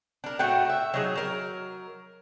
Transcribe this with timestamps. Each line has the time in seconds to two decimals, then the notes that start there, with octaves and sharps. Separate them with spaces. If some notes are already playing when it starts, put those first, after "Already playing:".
0.24 D4 A#4
0.39 A2 A3 F#4 G5
0.69 E5
0.94 F#3 D#4 G#4
1.16 F#3 A#4